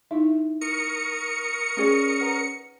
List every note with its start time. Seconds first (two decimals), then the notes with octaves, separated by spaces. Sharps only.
0.11 D#4 E4 E5
0.61 A#4 C#6 D#6 C#7
1.77 C#4 G#4 D5
2.19 B4 F#5 A#5